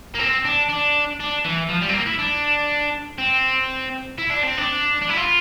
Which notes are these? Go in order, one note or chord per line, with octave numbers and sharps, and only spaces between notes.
A#3
C4
D4
D4
D4
E3
F3
G3
C4
A#3
E4
D4
C4
E4
D4
C4
D4
D4
E4
F4